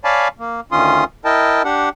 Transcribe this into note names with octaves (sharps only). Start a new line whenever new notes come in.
C#5 D5 F5 G#5 A5 B5
A#3
D2 D#3 C#4 F4 C6 D#6
E4 A#4 D#5 G5 A5
D4 G4 F#5